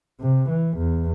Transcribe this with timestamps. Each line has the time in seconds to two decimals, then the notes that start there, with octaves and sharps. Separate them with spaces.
0.21 C3
0.50 E3
0.78 E2